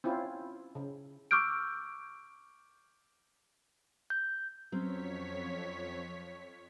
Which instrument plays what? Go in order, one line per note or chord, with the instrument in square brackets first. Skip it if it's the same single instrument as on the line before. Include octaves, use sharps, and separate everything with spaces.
[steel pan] C4 C#4 E4 F4
C#3
[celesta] C#6 D6 E6 F6 G6 D7
[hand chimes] G6
[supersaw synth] F2 C#5 B6 [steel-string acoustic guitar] F#3 C4 C#4